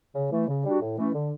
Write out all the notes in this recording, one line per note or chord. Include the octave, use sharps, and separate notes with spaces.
C#3
E3 A3
C#3
G3 D4 F#4
A2
E3 A3 C#4
D3